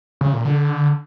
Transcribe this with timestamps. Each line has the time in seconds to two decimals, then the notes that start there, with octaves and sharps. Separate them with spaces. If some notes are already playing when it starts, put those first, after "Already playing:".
0.21 C#3
0.33 A#2
0.45 D3